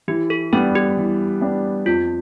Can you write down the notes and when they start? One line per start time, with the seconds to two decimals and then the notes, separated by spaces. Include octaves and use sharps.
0.08 E3 G4
0.30 A4
0.52 G3 B3 D4 A4
0.75 G4
0.97 E3
1.41 G3 B3 D4
1.86 F2 F4